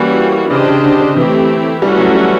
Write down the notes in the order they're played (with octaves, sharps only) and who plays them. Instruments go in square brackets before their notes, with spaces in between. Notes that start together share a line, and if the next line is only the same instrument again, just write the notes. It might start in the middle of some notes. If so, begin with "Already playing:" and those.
Already playing: [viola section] E3 G3 A#3 C#4 F#4
[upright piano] C#3 [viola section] D4 G4 C5 D#5
[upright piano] C#3
D3
D3
[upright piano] E3 [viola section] A3 C4 E4 G4
[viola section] E3 A3 C#4 F#4 [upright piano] G3
[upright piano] F#3
G3